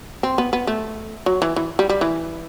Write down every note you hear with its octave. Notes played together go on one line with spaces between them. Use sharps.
C4
B3
B3
A3
F#3
E3
E3
G3
G3
E3